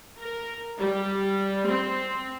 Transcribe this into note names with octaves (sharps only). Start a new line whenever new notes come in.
A#4
G3
C4